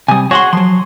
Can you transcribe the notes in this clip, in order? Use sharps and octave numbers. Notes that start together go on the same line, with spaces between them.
C3 G3 G#5 D#6
F#4 G#4 C#5 F#5 C6 C#6
F3 F#3 C6